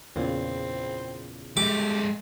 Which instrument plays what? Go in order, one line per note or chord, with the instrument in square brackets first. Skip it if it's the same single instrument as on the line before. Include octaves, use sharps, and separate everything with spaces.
[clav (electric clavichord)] E2 A#2 C#3 [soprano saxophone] C4
[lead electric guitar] G#3 A3 [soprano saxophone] G4 [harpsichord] D6